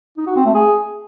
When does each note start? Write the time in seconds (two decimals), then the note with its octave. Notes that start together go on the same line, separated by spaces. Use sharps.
0.17 D#4
0.27 F#4
0.36 C4
0.45 A3
0.54 G#4